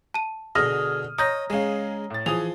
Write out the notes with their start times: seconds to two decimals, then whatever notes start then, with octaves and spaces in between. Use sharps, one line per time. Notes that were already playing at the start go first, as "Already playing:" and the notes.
0.14 A5 D#7
0.55 B2 D3 G#4 D#6 F6 A#6
1.18 C#5 D#5 A#5 D#6 G6 A#6
1.50 C#3 G#3 G#4 F5
2.10 A2 A6
2.26 E3 F3 G#4 D#6 F7